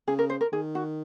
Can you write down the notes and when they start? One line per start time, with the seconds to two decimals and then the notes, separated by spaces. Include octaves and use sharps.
0.08 C#3 G#4
0.19 A#4
0.30 C5
0.41 A#4
0.52 D#3 G#4
0.75 F#4